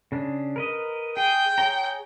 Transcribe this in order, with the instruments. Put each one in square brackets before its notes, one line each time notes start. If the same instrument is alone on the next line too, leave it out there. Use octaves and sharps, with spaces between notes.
[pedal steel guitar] C#3 D4
A#4 B4 D#5
[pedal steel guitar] G#4 [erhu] G5
[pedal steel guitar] G#4 C#5 A#5